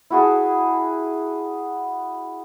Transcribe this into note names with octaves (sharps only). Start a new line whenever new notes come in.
E4 F#4 G#4 A5